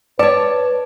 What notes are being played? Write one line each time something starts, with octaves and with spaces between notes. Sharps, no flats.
B4 C#5 D5 A5